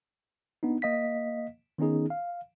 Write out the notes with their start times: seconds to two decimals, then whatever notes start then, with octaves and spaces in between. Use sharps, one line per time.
0.63 B3 D4 D#4
0.82 A#3 D#5 F5 B6
1.78 D#3 B3 C#4 D#4 G#4
2.10 F5